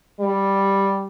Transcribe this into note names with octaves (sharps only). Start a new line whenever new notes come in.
G3